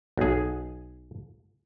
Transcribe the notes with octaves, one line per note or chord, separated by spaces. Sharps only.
B1 G#4